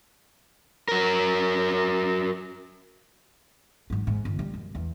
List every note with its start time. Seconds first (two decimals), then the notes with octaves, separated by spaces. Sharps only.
0.88 F#3 A#4
3.90 G#2 F#3
4.07 G#2
4.25 G1
4.39 G3
4.54 F#2
4.75 E2